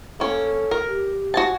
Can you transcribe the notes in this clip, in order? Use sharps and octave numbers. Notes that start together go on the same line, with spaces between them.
A#3 C#4 A4
A#4
G4
F#4 G#5 A5